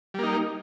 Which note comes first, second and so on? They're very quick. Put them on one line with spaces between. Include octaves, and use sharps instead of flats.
G3 A#3 D#4